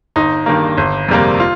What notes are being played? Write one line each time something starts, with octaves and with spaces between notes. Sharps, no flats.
G1 D#4
G2 D#3 G3 A#3
G1
F2 C3 G3 A#3
F4